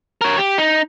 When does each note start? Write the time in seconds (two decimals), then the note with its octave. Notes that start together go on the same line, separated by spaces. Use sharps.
0.21 A#4 C#5
0.38 G4
0.58 D#4